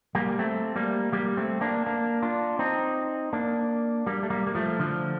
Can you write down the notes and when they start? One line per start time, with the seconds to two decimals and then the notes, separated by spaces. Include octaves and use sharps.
0.15 G3 A#3
0.39 A3 C4
0.76 G3 A#3
1.12 G3 A#3
1.37 A3 C4
1.61 A#3 D4
1.86 A#3 D4
2.22 D4 F4
2.59 C4 D#4
3.33 A#3 D4
4.07 G3 A#3
4.23 A3
4.30 G3 A#3
4.47 A#3
4.55 F3 A3
4.79 D3 F3